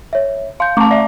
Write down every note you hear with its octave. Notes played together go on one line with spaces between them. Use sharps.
C#5 E5
F5 C6 G6
A3 A5 A#5 C#6 D6
D5 E5